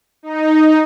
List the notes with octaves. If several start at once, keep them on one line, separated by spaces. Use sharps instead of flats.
D#4